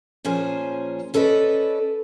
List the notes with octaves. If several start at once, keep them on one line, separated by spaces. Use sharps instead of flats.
A#2 F3 C#4 G#4 C5
C#4 A4 B4 D5 D#5